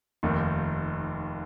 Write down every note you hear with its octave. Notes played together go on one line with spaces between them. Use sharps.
F1 D#2 D#3